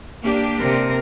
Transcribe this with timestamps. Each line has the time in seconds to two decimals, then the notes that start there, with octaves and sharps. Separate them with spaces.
0.23 A#3 D4 G4
0.59 C3 A#4